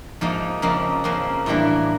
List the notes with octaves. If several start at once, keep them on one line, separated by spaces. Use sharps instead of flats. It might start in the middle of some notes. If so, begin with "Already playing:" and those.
G#2 F3 A#3 D#4
F2 C#3 F3 A#3
F2 C#3 F3 A#3
A2 E3 G3 A#3 D4